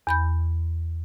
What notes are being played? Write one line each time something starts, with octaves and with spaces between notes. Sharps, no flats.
E2 B5 G6